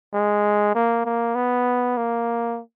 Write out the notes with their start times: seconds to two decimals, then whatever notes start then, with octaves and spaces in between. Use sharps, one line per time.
0.13 G#3
0.75 A#3
1.05 A#3
1.35 B3
1.97 A#3